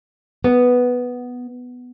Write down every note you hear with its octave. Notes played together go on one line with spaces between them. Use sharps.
B3